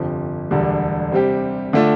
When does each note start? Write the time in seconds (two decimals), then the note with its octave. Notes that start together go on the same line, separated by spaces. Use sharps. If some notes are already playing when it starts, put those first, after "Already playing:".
Already playing: G1 F2 C3 F3
0.51 E1 D2 D3 G3 D4
1.12 C3 G3 C4 G4
1.73 D3 A3 D4 F4